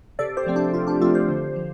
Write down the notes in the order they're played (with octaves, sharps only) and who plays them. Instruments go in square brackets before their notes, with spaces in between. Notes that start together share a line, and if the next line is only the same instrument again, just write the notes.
[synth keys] C3 A4 D5
G4 C5
F3 A3 C4
D4 G4
C3 F4
D4 G4
F3 A3 C4 F4 A4
G4 C5
D3
F3